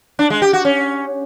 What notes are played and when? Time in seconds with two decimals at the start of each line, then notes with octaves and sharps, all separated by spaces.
0.19 D4
0.30 G#3
0.42 G4
0.53 F#4
0.65 C#4